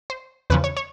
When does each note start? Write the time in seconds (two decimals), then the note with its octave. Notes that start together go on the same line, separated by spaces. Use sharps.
0.10 C5
0.50 E2 C#3 F3 B4
0.64 C#5
0.77 C#5